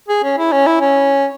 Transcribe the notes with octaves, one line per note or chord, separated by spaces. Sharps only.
G#4
C#4
E4
C#4
E4
C#4